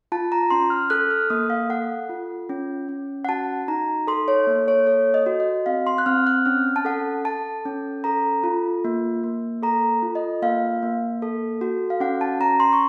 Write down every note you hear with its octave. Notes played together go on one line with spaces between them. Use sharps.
F4 A5
A#5
C#4 C6
F6
A4 F#6
F6
A#3 D#6
F5
A4 F#5
F4
C#4
C#4
F#5
F#4 A5
D#4 A#5
A4 C6
C#5
A#3
C#5
A4 C#5
D#5
F#4
D#5
C4 F5
C6
F#6
C4 F6
F#6
C#4 F6
A5
A4 F#5
A4 A5
C#4
A4 A#5
F4
A#3
A#3
A4 A#5
F4
D#5
A#3 F5
A#3
A4
F#4
F5
C#4 F#5
A5
C#4 A#5
C6
C#6